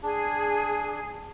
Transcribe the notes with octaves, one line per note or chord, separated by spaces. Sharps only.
D4 G#4